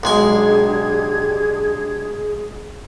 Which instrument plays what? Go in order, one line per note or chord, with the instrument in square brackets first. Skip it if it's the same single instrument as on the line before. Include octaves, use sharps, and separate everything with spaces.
[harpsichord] B1 G#3 G#5 [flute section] D4 G4 G#6 [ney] G#4